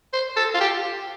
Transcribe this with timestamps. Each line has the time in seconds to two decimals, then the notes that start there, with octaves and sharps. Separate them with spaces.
0.13 C5
0.36 A4
0.54 F4
0.60 G4